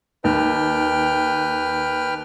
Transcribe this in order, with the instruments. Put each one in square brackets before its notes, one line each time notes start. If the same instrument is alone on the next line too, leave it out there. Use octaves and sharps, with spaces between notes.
[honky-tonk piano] D#2 [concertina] B4 G5 F6